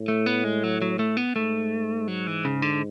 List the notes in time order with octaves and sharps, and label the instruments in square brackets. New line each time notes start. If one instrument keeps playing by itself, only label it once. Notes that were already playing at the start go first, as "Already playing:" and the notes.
Already playing: [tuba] A2
[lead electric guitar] A3
B3
G#3
F#3
F#3
A3
B3
[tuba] G#2 [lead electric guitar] A3
[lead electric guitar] F#3
E3
C#3
D3